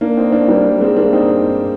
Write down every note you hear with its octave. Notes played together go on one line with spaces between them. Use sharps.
A#3 D4
C4 D#4
A#3 D4
G3 A#3
G#3 C4
A#3 D4
C4 D#4